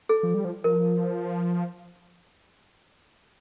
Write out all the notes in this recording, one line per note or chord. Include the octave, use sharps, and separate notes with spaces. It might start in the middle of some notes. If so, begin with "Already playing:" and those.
A4
F3
G3
F3
F3 A#4